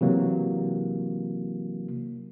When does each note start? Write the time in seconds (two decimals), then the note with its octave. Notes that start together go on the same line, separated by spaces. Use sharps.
0.01 C3 E3 F#3 A#3